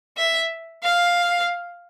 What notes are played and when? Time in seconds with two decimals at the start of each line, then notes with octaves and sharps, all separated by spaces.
0.17 E5
0.83 F5